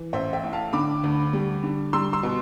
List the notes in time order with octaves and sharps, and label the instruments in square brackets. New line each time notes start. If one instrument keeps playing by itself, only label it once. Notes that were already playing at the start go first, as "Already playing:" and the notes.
Already playing: [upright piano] E3
A1 C5 E5
E5 G5
A2
F5 A5
D3 B5 D6
D2
G3
D3
G3 C6 E6
C6 E6
B2